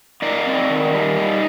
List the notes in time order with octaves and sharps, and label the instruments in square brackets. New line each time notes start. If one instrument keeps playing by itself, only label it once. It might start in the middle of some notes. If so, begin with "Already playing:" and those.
[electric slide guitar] D#4 A#4 D5
C4
D#3
G3
D#4